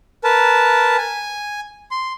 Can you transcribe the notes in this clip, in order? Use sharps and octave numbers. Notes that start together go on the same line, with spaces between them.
A#4 B4 A5
G#5
C6